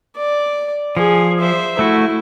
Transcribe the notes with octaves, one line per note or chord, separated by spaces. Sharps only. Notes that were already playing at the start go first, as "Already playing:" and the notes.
D5
F3 G#4
C5 E5
A3 E4 F#4